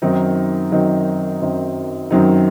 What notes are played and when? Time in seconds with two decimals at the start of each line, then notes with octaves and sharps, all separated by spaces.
0.02 F#2 D#3 F#3 C4 D#4
0.72 F#2 D#3 F#3 C4 D#4
1.41 F#2 D#3 F#3 C4 D#4
2.11 F#2 D#3 F#3 C4 D#4